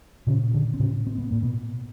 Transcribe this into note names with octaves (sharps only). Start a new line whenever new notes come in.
A#2 C#3 C#4
D3 D4
C4
A2 C#3 C#4
C4
B3
A2 A#3
B2 B3